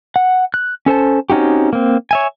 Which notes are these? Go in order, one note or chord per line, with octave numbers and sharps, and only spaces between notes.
F#5
F#6
C#4 A4 C5 A5
C4 C#4 D#4 F#4 G4
A#3 C4
C#5 E5 G#5